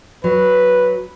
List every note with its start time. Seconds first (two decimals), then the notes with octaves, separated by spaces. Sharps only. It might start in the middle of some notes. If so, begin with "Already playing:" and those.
0.24 F#3 B4